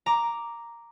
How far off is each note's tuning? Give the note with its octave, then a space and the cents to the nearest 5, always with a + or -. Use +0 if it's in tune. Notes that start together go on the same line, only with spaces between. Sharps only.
A#5 +0 D6 +0